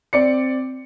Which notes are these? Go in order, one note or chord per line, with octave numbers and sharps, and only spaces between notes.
C4 D5 C#7